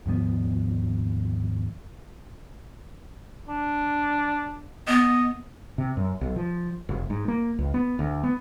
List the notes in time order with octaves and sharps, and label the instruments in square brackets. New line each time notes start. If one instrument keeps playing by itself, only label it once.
[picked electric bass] D#2 G#2 F3 B3
[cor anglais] D4
[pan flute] B3 [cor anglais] D#5
[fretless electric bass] C3
F#2
B1
F3
F1
G#2
A#3
C#2
B3
D2
B3